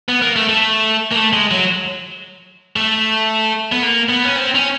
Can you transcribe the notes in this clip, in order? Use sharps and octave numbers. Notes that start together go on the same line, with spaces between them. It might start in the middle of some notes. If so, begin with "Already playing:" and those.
B3
A#3
A3
A3
A#3
A3
G#3
F#3
A3
B3
A#3
B3
C#4
C4
C#4